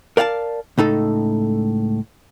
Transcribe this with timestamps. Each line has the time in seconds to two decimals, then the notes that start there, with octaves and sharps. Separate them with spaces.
0.17 A#4 D5 F5 F#5 A5
0.78 C#2 A2 D#4 A4